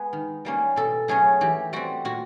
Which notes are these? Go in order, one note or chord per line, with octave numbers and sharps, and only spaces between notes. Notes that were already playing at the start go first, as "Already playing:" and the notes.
Already playing: G#3 B3 B4
D#3
G3 A#3 C#4
B2 A4
F#3 A3 C#4 G#4
E3 G4
G3 C4 F#4
A#2 F#4